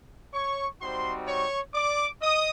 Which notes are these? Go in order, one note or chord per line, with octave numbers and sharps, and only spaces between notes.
C#5 C#6
G3 C4 D#4 F#4 C5 C6
C#5 C#6
D5 D6
D#5 D#6